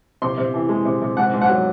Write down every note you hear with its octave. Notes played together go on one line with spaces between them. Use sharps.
C3 C6
C3
E3
G#3
C3
C3
G#2 F#5
G#2
F#5
F#3